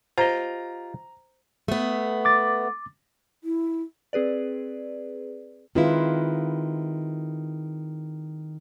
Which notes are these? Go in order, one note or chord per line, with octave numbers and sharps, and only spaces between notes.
F4 G4 C5 D#5 A#5
A3 B3
D6 A6
E4
C4 G#4 B4 D5
D#3 G#3 C4 E4 F4 B4